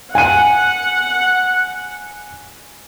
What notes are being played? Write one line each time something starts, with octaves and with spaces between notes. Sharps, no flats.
F#5 G#5 D#7